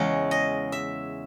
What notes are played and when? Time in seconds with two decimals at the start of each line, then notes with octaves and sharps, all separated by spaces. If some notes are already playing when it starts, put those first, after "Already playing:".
Already playing: E2 C#3 G#3 C#5
0.31 D#5
0.72 E5